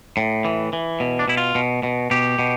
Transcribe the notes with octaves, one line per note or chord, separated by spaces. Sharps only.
A2
E3
E3
B2
D4
B2 E4
F4
B2
B2
B2 G4
B2